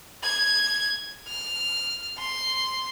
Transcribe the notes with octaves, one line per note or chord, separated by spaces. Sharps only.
G#6
F6
C6